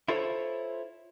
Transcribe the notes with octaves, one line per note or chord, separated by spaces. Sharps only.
E4 F4 A4 C5 C#5